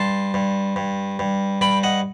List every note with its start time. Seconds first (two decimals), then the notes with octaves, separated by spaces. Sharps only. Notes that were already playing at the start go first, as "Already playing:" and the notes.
Already playing: G2 A5 C6
0.34 G2
0.76 G2
1.19 G2
1.61 G2 G5 B5
1.83 D#5 F#5